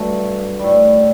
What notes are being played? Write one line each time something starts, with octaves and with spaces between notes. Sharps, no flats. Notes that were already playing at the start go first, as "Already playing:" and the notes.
Already playing: G2 F#3 A3
A2 G3